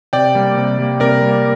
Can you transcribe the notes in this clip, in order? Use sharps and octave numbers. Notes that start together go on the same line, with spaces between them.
C3 D5 G5
G3 A#3
C3
G3 A#3
C3 A#4 D5
G3 A#3